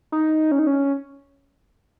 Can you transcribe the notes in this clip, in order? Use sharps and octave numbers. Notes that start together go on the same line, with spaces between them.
D#4
C#4
D#4
C#4